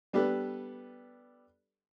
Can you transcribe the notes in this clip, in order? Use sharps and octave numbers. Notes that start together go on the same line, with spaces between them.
G3 B3 D4 G4 A4 B4